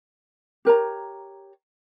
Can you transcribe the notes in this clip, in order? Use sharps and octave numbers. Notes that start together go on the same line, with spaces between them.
G4 A#4 C#5 A#5